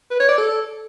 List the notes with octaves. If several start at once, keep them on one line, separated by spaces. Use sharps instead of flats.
B4
C#5
D5
A4